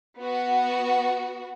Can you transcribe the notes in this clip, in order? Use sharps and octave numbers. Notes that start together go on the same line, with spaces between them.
B3 F#4